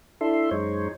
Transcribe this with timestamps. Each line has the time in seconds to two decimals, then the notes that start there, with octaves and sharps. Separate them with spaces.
0.21 D4 E4 A4 E5 C6
0.51 F#2 G#3 D#4 C5 C#5